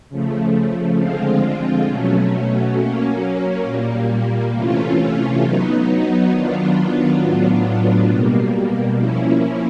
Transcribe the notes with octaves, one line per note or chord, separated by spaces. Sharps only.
C#3 F3 A3
D3 F3 G#3 C4 F4
B2 F#3 A3 C#4
F#3 A#3 C#4
A#2 G3 A#3
C3 E3 A3 C#4 F4
F#3 B3 D#4
D#3 F#3 B3 D4 F4
A2 F#3 B3 D4 F4
B2 G3 A#3
F3 A#3 C#4 E4